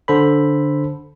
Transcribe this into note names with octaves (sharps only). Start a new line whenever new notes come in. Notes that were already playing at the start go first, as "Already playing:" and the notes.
D3 A4 C5 B5